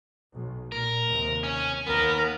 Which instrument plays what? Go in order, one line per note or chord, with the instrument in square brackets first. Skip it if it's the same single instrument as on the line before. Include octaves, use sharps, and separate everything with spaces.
[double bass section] B1
[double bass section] A#2 [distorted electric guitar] A#4
[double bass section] D#2 C3
[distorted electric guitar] C#4
[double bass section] D#2 [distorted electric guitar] B3 [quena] A#4